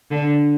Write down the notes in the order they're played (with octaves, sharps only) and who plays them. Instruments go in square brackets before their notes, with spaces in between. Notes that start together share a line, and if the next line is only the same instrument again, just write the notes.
[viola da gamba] D3